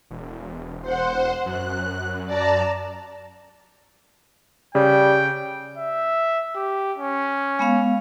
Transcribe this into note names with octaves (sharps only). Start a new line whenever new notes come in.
E1
C5 F#5
F#2 F#6
D5 A5 A#5
C#3 G3 G5
E5
G4
C#4
G#3 B3 F5